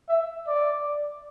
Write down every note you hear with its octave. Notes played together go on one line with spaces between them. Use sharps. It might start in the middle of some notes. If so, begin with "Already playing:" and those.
E5
D5